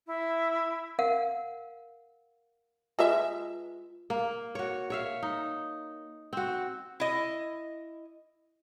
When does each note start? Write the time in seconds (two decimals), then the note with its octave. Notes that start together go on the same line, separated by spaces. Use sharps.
0.07 E4
0.99 A#4 F5 F#5
2.99 G#3 F4 B4 E5
4.10 A#3
4.55 F#4 C#5
4.90 C#5 E5 F5
5.23 D#4
6.33 C4 F#4
7.00 E4 D#5